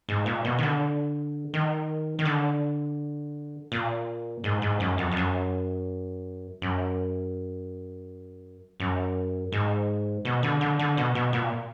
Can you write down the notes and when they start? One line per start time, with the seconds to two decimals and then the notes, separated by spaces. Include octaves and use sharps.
0.09 G#2
0.26 A#2
0.45 B2
0.59 D#3
0.63 D3
1.54 D#3
2.19 D#3
2.25 D3
3.72 A#2
4.44 G#2
4.62 G#2
4.80 F#2
4.98 F2
5.12 F2
5.17 F#2
6.62 F#2
8.80 F#2
9.52 G#2
10.25 B2
10.43 D3
10.61 D3
10.79 D3
10.97 B2
11.15 B2
11.33 A#2